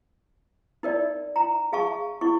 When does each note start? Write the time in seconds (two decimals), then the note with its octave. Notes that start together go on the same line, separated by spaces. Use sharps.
0.83 D#4 A#4 D5
1.36 A#5
1.72 G#4 F5 A5 C#6
2.21 E4 C#6